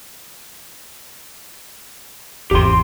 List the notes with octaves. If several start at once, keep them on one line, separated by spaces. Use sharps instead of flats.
G#1 E2 G4 C6